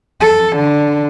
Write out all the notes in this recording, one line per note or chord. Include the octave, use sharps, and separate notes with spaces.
A4
D3